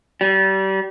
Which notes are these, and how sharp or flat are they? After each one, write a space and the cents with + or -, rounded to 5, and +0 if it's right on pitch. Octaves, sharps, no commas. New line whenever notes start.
G3 -30